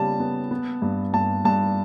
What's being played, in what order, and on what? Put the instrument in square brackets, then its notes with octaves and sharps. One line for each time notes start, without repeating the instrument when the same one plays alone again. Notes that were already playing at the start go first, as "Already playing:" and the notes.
Already playing: [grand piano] C#3 G3 B3 A5
B3
B3
G2
G2 A5
G2 A5